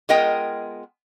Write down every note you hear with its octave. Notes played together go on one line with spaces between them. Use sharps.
G#3 B3 F4 A#4 D#5 G5